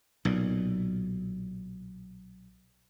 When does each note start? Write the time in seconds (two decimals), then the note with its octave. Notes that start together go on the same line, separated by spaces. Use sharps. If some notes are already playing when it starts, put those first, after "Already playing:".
0.25 B1 A#2